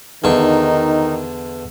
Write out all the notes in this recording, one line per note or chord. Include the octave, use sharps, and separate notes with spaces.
E2 D3 D#3 D#4 C#6